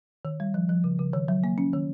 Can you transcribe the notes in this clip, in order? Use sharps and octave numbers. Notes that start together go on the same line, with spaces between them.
D#3
G3
F3
F3
C#3
C#3
D#3
F#3
A#3
C#4
D#3